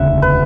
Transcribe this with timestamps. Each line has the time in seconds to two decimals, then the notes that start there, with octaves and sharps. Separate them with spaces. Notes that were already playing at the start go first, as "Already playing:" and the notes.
Already playing: E1 D2 C#3 E5 F#5
0.22 B4